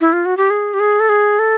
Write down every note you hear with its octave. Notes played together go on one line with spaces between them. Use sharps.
E4
F4
F#4
G4
G#4
G4
G#4
A4
G#4
A4